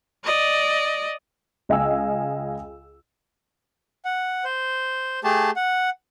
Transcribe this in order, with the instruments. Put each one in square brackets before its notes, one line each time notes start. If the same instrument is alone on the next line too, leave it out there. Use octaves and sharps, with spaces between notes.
[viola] D5 D#5
[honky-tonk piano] C#2 D#5 F5 G5 G#5 E6
[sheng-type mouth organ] F#5
C5
A3 G4 G#4 A5
F#5